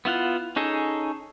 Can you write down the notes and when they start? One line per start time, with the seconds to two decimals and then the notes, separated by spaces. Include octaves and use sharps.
0.05 B3 E4 F4 F#5
0.56 C#4 D#4 G#4 A4